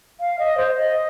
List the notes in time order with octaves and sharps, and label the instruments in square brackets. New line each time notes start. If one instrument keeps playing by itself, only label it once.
[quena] F5
D#5
C5
D#5